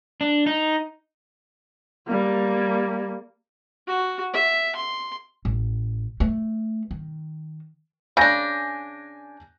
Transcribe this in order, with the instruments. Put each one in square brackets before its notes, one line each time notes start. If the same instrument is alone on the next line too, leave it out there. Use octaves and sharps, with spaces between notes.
[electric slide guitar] D4
D#4
[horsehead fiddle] G3 A#3
[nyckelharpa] F#4
E5
C6
[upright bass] A1
A3
D#3
[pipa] C#3 D4 [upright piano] G#5 G6 A#6